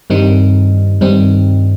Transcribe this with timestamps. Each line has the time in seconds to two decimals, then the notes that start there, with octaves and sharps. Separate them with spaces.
0.10 G2 D#3 G3 C4 D#4
1.01 G2 D#3 G3 C4 D#4